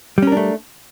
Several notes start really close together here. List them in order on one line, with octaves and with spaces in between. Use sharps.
G3 C#4 A#4 D4 A3